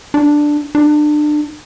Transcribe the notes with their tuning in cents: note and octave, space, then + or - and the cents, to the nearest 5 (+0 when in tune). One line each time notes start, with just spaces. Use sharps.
D4 +5
D4 +30